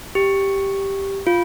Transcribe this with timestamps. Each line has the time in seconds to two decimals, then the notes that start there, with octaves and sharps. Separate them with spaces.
0.15 G4
1.27 F4